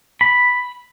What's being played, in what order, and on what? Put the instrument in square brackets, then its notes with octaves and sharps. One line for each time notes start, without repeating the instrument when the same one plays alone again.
[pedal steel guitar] B5